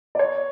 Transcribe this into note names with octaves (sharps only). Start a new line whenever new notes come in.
D5
C#5